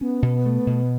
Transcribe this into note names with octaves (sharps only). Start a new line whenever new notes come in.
B3 C#4
B2
A3
B2